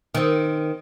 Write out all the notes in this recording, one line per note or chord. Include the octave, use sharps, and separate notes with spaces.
D#3 C4